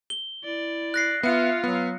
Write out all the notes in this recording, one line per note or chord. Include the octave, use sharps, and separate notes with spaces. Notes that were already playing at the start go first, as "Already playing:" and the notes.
G7
E4 D5
F#6 A#6 C7
B3 F4 E5 F5 C#7
F#3 B3